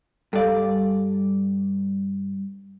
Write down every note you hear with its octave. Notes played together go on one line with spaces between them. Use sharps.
G2 A4 D5 F5